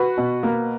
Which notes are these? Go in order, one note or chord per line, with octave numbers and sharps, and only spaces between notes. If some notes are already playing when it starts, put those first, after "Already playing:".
Already playing: F#4 B4
B2
A#3